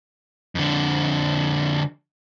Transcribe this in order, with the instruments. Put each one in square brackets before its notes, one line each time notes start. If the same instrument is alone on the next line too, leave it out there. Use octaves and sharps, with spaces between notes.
[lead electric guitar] F2 D3